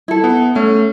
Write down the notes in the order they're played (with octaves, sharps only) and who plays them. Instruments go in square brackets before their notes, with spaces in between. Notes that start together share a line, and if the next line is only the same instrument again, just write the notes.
[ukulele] E4 A4
[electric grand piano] B3
[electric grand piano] A3 [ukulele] C#4